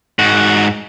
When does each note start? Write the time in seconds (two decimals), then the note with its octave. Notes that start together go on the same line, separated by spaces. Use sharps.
0.19 G#2 F#4